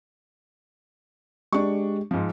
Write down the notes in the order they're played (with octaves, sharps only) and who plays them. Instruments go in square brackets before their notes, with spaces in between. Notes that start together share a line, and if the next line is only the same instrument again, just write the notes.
[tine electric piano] G#3 G4 [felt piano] D4 C#6
[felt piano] G#2 F3